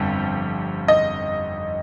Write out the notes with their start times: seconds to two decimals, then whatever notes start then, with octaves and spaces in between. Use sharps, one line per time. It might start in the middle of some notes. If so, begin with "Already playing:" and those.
Already playing: G1 F2 G3
0.88 D#5